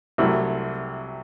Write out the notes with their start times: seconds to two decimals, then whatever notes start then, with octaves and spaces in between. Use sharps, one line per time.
0.18 C2 C3 F#3 A3 E4